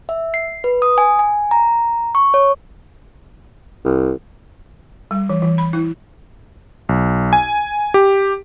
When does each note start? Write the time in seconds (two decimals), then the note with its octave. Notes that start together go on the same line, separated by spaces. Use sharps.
0.09 E5
0.34 C7
0.64 B4
0.82 D#6
0.98 G#5
1.19 G#5
1.51 A#5
2.15 C#6
2.34 C#5
3.85 C2
5.11 G3
5.29 E3
5.42 E3
5.58 B5
5.73 E4
6.89 B1
7.33 G#5
7.94 G4